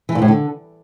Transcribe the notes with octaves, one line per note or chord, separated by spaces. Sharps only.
E3
A#2
A2
D3